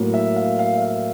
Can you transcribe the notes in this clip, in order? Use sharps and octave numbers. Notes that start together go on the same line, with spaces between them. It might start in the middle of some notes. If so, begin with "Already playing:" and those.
Already playing: A2 F#3 A#3
E5
F5
F5
E5
F5